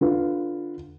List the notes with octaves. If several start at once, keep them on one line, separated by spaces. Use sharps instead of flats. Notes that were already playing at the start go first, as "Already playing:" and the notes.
D3 F4 B4